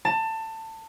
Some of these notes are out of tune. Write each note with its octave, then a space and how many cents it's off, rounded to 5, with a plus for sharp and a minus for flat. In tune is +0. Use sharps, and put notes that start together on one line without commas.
A5 +20